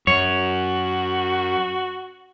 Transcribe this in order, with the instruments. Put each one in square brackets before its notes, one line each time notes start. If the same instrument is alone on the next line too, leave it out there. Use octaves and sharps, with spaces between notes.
[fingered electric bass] F#2 [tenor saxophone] F#4 [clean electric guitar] C#5